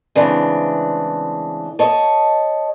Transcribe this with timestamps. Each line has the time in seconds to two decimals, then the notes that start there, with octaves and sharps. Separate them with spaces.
0.16 C#3 E3 G#3 A3 C4 D4
1.79 A4 C#5 D#5